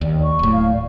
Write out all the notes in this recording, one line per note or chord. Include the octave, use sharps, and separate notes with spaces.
D#2 D5
C#6
D1 A2
F5
D5